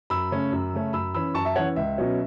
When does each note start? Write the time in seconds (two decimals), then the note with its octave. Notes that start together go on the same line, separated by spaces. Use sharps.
0.10 F#2 B5 E6
0.31 C#3 A3 C#4
0.52 F#2
0.74 C#3 A3 C#4
0.93 F#2 B5 E6
1.14 E3 C#4 B5 E6
1.35 F#2 A5 C#6
1.45 E5 A5
1.55 E3 C#4 C#5 F#5
1.76 C#2 E5
1.98 B2 F#3 C#4